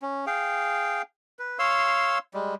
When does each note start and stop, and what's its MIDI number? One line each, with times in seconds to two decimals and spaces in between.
0.02 0.25 61
0.27 1.02 68
0.27 1.02 77
0.27 1.02 79
1.39 1.58 71
1.59 2.18 73
1.59 2.18 77
1.59 2.18 84
1.59 2.18 88
2.34 2.55 55
2.34 2.55 56